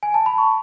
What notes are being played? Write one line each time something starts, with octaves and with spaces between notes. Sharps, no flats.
G#5
A5
B5
C#6